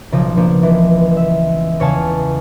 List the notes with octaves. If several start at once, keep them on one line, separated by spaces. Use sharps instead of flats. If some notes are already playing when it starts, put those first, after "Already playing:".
B1 C#3 F3
F3 A#3 B3 D4
C#2 E3
E5
E2 C#3 C#5 F5 G#5 A5